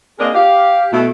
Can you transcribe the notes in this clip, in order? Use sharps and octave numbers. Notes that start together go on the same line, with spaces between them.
A#3 C4 D4 G#4 A#4 D#5
G4 F5
B2 A3 E4